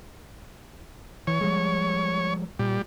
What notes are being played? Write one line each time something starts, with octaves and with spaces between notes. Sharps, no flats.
E3 C#5
F3 G3 G#3
A#2 G3